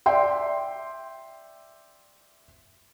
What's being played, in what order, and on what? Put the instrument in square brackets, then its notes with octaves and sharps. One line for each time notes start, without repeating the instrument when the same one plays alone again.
[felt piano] D5 E5 G5 C6